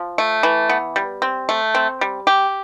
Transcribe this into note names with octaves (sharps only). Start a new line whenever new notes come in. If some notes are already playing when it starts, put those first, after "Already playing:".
Already playing: F3
A3
E3
B3
G3
C4
A3
C4
G3
G4